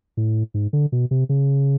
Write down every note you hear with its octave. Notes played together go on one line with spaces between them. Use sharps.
A2
G#2
D3
B2
C3
C#3